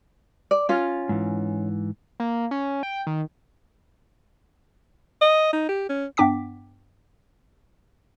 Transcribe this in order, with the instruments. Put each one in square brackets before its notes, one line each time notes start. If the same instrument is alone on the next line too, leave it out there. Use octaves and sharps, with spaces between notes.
[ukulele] D5
C#4 F4
[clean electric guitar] G#2 E3
[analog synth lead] A#3
C#4
G5
D#3
[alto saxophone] D#5
D#4
G4
C#4
[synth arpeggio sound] G2 B3 D4 G5 D6 B6